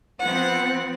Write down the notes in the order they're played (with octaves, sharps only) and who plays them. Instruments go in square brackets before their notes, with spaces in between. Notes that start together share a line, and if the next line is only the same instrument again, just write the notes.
[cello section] F3 B3 C4 [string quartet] F#5